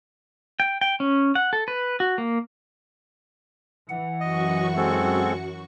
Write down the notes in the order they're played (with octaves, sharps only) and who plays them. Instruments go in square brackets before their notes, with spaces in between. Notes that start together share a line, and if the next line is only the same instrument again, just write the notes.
[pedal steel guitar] G5
G5
C#4
F#5
A4
B4
F#4
A#3
[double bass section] E3 [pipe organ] F#5
[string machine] F#2 F#4 C#6 [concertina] D#5
[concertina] G#3 C4 A4